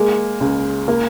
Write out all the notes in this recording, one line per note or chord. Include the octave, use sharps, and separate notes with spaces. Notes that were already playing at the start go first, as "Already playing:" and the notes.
Already playing: G#3 A#3
C#2
A#3